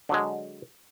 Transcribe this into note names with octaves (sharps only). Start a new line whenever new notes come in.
D3 F#3 G#3